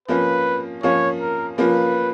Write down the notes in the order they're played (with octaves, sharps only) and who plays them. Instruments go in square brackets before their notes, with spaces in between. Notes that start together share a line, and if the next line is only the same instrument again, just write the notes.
[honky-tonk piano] F3 A#3 C#4 F4 [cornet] B4
[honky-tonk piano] F3 A#3 C#4 F4 [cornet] C#5
[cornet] A#4
[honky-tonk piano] F3 A#3 C#4 F4 [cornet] B4